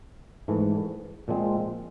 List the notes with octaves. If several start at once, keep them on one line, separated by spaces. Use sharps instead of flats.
G#2 E3 A3
A#2 F3 G#3 C4